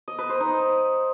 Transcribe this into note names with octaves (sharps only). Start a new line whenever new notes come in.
D#5
B4
C5
D#4